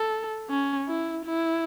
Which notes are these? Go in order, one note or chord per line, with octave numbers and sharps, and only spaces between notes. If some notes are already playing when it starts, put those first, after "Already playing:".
Already playing: A4
C#4
E4
E4